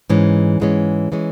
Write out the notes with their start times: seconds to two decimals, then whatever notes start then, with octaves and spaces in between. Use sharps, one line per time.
0.10 G#2 E3 G#3 C#4
0.60 G#2 E3 G#3 C#4
1.12 E3 G#3 C#4